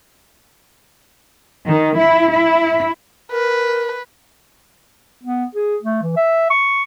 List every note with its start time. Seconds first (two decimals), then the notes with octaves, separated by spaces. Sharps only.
1.68 D#3
1.99 E4
2.33 E4
3.32 A#4 B4
5.24 B3
5.55 G#4
5.82 A3
6.03 E3
6.16 E5
6.50 C#6